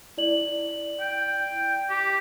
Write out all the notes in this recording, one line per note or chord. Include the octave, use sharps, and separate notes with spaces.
E4 D5 F#7
G5
G4